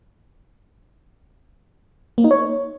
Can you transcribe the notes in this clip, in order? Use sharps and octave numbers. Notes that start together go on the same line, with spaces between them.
A#3
D#4
C#5